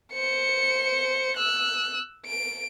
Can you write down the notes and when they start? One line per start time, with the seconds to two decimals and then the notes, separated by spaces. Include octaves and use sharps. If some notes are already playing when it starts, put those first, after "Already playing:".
0.14 C5 C#7
1.37 E6 F#6
2.26 D7